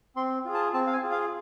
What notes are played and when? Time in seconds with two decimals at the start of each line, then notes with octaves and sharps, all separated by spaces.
0.16 C4 C6
0.45 F4 G#4
0.54 A5
0.74 C4 A5
0.87 F5
0.93 G#5
1.03 F4 G#4
1.12 F5